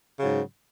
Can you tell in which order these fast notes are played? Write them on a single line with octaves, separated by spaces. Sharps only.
C#3 F#3 G#2